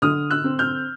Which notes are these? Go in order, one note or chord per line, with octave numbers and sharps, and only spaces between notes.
D3 D#6 F6
E6 F#6
C4
F6 G6